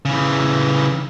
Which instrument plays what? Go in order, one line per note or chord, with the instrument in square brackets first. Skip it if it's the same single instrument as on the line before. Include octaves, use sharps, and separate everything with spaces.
[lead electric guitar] C#3 E3